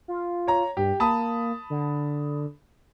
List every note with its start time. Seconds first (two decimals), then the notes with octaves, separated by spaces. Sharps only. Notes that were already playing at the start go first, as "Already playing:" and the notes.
0.08 F4
0.47 C#5 A#5
0.77 G2 G4
1.00 A#3 A5 B5 D#6
1.70 D3